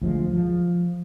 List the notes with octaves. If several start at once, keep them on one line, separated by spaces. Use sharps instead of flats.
D2 F3 G#3
F3